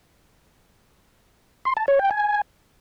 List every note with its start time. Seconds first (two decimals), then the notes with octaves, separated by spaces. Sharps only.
1.65 C6
1.77 A5
1.88 C#5
1.99 G5
2.11 G#5